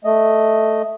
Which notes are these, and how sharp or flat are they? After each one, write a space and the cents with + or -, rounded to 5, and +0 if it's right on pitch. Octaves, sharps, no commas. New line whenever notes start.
A3 +0 D#5 +0